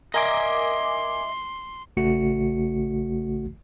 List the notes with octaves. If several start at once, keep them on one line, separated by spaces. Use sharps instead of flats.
A#4 D#5 E5 G#5 C6 D6
A1 C#3 A3 F#4 C#7